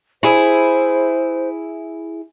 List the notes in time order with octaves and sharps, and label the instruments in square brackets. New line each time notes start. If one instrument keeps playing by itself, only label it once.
[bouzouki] E4 G#4 [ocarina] C5